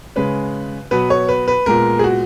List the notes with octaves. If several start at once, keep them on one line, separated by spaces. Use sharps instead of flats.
C#3 G#3 C#4 B4
B2 F#3 B3 B4
C#5
B4
B4
A#2 G#3 B3 A#4
G#4
F#4